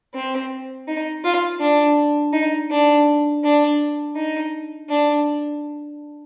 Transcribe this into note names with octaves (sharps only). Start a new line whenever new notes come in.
C4
D#4
F4
D4
D#4
D4
D4
D#4
D4